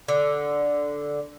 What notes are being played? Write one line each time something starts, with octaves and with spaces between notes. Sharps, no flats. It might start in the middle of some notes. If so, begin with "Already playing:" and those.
D3